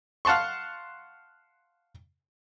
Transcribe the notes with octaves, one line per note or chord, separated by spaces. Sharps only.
F5 F#5 A5 C6 C#6